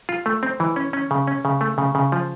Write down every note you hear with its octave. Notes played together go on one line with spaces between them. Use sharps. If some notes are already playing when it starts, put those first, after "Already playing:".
F4
A3
C4
E3
C#4
C#4
C#3
C#4
C#3
A3
C#3
C#3
F3